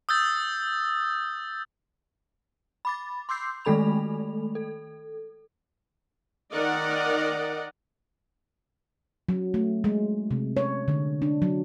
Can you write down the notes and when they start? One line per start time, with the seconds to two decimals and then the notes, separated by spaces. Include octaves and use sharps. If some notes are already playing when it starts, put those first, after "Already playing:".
0.09 D#6 E6 G6 A6
2.85 B5 D6 A6
3.29 C6 D6 E6 G6 C7
3.65 D#3 G#3 A3 A4 B5 F7
4.55 A4
6.52 D#3 A#4 D5 D#5 F#5
9.29 F#3
9.54 A3
9.84 G#3
10.31 C3
10.57 C#5
10.88 D3
11.22 D4
11.42 F#3